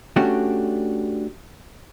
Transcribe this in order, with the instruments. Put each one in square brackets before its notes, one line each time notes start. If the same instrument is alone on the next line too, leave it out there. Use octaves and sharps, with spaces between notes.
[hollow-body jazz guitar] A3 C#4 D4 F#4 G4